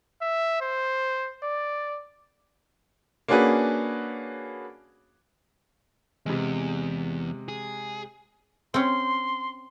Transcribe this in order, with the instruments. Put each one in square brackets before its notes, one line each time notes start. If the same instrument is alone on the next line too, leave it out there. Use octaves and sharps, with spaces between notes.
[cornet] E5
C5
D5
[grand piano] A#3 C#4 D4 F#4 G#4 B4
[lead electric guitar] E2 [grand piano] C3 G#3
[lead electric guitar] G#4
[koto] C4 C#4 [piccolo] C6